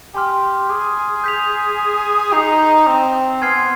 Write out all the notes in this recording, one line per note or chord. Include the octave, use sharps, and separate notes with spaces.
G4 G#5 C6 F6
G#4
G6 B6 F7
D#4 G6 C7 F7
C4
B3 G#5 C6 F6 G#6 C7